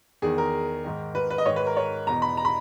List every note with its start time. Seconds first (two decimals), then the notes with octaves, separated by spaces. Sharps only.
0.22 E2 D#3 G#4
0.38 A#4
0.84 G#2 D#3
1.15 B4
1.30 B4
1.38 D#5
1.46 G#2 D#3 C#5
1.56 B4
1.66 A#4
1.77 C#5
2.07 E2 B2 A#5
2.22 B5
2.37 A#5
2.45 B5